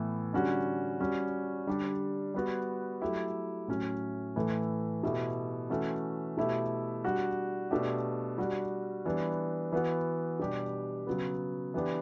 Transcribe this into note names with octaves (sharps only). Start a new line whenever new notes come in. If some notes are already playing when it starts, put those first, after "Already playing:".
Already playing: A2 E3 B3
D3 G3 C#4 F#4
G3 C#4 F#4
D3 G3 D4 G4
G3 B3 F#4
F#3 A3 E4 G4
A2 F#3 C#4
A2 E3 A3
B2 A3 E4 G4
E3 A3 C#4 F#4
B2 A3 E4 G4
G3 D4 F#4
B2 A3 D4 G4
G3 D4 F#4
E3 G3 B3 D4
E3 B3 F#4
B2 G3 D4 G4
C#3 F#3 B3
E3 B3 D4 G4